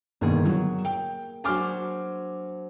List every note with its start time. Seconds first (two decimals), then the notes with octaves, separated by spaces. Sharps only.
0.21 G1 B2 D#3 A#3 G#4
0.45 F#3
0.85 G5
1.44 F#3 D4 C5 G#5 D6 F6